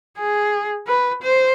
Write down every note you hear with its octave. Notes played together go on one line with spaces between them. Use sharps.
G#4
B4
C5